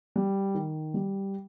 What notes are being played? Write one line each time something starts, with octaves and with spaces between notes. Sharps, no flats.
G3
D#3
G3